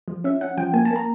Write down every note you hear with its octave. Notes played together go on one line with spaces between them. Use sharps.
F3
C#4 E5
C#4 F#5
F3 G5
A#3 G#5
A5
A#3
A#5